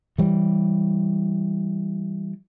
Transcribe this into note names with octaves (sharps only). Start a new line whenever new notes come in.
E3 G3